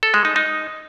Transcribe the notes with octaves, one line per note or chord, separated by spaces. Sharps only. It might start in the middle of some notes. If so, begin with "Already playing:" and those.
A4
G#3
D#4
D#4